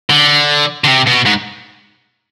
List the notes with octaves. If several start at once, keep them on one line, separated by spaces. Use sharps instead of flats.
D3
D3
C3
B2
G#2